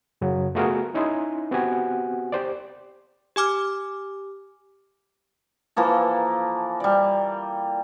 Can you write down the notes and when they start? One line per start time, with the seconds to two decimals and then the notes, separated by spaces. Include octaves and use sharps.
0.21 F#2 C#3 F#3
0.55 A3 B3 F4 F#4 G#4 A#4
0.94 C#4 D#4 E4 G#5 C6
1.51 B3 C4 F#4 G4 F#5 G#5
2.32 G4 C5 D5
3.36 G4 G#5 D6 F6
5.76 E3 F3 A#3 A4
6.80 G3 D5